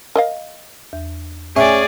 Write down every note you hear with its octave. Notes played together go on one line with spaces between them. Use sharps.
A#4 D#5 F5
E2
A3 C#4 G#4 D5 E5